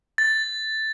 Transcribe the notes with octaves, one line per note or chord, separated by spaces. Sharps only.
A6